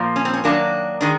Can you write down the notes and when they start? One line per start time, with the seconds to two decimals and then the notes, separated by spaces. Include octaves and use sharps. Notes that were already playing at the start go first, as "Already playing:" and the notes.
Already playing: A#2 F3 A#3
0.16 C#4
0.25 C4
0.34 C#4
0.44 F#2 D#3 F#3 A#3 D4
1.01 D#3 G#3 D4